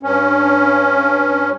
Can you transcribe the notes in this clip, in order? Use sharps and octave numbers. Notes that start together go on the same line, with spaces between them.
G2 C#4